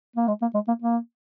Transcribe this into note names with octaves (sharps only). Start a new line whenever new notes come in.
A#3
G#3
A#3
G#3
A#3
A#3